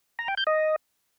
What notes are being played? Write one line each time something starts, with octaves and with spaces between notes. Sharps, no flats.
A#5
G5
G6
D#5